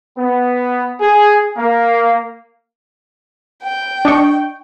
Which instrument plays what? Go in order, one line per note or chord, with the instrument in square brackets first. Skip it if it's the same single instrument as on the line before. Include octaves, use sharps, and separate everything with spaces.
[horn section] B3
G#4
A#3
[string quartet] G5
[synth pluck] D4 D#5 C#6